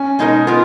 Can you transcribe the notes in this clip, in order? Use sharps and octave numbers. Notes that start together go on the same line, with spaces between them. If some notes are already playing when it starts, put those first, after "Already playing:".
Already playing: C#4
B2 G#3 D#4 A#4
B3 F4 A#4